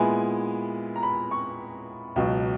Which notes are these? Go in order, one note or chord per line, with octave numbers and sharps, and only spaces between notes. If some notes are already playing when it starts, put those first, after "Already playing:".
Already playing: A#2 G#3 B3 E4 G#5
A#5
B5
C#6
C#2 B2 F#3